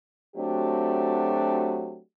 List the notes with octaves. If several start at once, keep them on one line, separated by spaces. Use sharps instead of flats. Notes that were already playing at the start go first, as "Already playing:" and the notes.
F#3 A3 C4 D4 F#4 G4